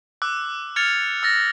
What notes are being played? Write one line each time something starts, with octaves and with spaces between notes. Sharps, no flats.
D6 E6 F#6
F6 G#6 A6 C#7 F7
E6 A6 A#6